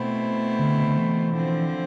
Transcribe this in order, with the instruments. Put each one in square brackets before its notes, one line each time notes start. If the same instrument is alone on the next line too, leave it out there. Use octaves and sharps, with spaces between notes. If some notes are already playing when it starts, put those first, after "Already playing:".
Already playing: [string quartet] B2 A3 C4 E4
[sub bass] D3
D3
E3
[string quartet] D3 F3 C4